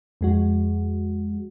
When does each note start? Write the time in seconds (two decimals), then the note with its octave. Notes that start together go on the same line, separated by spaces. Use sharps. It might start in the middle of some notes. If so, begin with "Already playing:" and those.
0.21 F2 G#3 F#4